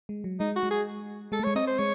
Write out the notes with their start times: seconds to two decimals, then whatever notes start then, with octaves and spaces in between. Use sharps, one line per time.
0.09 G#3
0.24 F#3
0.40 G#3 D#4
0.56 F#4
0.63 G#3
0.71 G#4
1.32 G#3 A4
1.40 A3
1.44 G#3 C#5
1.55 C4 D#5
1.67 C5
1.79 G#3 C#5